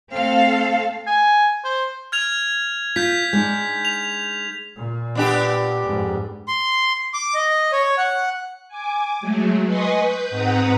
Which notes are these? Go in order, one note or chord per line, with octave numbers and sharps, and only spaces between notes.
A3 C4 A4 F5
G#5
C5
F6 G#6 F7
F4 G6 B6
G#3 D4 D#4
F7
A#2
B3 D4 G4
F2 G#2
C6
D6
D#5
C#5
F#5
G#5 D6
F#3 G#3 A3
B4 D#5 G#5 C6 C#6 D#6
B4 G6
G#2 C4 B4 F#5 A#5 D#6